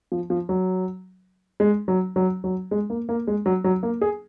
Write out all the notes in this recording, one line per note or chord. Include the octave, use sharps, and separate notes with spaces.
F3
F3
F#3
G#3
F#3
F#3
F#3
G#3
A#3
A#3
G#3
F#3
F#3
A#3
G#4